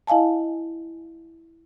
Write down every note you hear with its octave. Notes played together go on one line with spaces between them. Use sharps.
E4 D#5 F5 G#5 A5